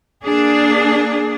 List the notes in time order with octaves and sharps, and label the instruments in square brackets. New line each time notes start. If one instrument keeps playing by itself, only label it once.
[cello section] A#3 D4 G#4